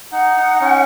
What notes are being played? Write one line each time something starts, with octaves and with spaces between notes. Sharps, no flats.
D#4 F#5
D#4
C#4